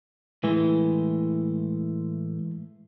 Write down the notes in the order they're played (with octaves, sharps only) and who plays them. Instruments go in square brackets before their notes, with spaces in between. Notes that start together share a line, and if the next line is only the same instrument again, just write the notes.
[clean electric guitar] A2 G#3 A3 [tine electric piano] E3